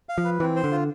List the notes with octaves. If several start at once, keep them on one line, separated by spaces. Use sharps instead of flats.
F5
F3
B4
E3 C4
C5
D3
F4